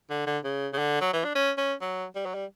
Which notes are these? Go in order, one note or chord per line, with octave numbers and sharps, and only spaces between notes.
D3
D3
C#3
C#3
D3
F#3
E3
D4
C#4
C#4
F#3
G3
F#3
G3